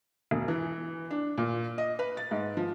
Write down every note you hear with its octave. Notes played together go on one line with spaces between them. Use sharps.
E1
E3
D4
A#2
D#5
B4
A6
G#2
F3